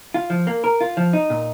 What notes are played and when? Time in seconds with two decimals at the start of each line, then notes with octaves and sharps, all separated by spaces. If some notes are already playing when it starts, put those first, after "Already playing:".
0.14 F4
0.30 F3
0.47 A#3
0.64 A#4
0.81 F4
0.97 F3
1.13 D#4
1.30 A#2